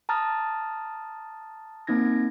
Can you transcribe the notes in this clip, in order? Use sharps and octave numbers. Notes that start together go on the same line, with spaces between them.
A5 A#5 D#6 F6 A6
A#3 C4 D#4 G#6 A#6